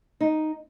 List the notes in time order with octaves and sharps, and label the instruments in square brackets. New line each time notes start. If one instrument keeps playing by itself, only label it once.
[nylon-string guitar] D#4